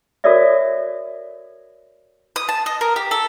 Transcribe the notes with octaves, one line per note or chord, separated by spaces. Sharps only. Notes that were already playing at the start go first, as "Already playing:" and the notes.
F#4 A4 A#4 C#5 D5 E5
D#6
A5
D#5
A#4
G4
A4